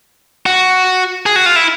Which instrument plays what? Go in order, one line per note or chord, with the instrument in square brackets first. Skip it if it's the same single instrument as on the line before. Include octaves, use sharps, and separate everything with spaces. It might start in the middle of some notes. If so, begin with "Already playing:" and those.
[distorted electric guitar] F#4
G#4
F#4
F4
E4